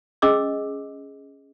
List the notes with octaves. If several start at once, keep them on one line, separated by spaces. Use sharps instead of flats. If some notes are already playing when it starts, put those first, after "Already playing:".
C#4 G#4 D#5 D6 E6